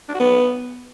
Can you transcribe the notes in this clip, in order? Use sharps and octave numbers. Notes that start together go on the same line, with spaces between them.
D4
F#4
B3